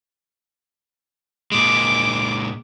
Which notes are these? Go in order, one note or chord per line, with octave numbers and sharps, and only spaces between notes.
A#2 G#3 D6